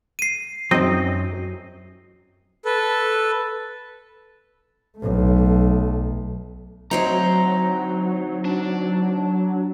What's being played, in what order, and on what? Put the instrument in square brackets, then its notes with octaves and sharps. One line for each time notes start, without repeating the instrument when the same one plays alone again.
[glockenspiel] C7 D#7
[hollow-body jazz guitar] F#2 F#3 [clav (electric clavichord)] C4 D#4 [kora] D#5
[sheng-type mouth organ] A4 B4
[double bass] B1 A3
[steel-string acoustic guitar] D2 C4 D#4 [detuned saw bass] F#3 [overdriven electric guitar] A#5
[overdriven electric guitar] D4